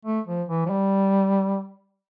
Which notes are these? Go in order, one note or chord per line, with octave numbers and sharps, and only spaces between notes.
A3
F3
E3
F3
G3